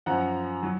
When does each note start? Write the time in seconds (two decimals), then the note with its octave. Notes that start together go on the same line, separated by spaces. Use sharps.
0.06 F#2 F3 F#5 A#5
0.63 F#3